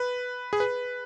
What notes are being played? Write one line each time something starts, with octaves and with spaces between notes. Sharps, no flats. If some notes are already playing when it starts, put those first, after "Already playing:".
Already playing: B4
G#4
B4